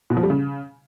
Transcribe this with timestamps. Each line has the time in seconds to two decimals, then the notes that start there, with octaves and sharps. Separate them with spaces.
0.10 B2
0.17 F3
0.23 G3
0.30 C#3